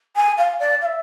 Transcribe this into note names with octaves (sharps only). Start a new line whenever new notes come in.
G#5
F5
D5
F5
E5